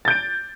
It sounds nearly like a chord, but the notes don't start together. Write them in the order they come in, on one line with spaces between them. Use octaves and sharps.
A6 G6 D7